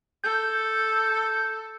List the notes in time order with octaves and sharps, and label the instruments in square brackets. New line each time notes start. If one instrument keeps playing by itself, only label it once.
[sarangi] A4 [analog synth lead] G6